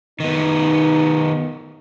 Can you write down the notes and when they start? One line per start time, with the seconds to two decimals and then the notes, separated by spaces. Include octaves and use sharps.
0.20 D#3 B3 D#4